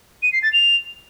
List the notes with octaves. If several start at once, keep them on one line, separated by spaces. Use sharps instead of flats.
D#7
C7
A6
F7